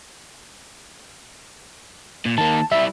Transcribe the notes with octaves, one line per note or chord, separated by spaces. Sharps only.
A#2
D#3 A#3 A5
G3 E4 E5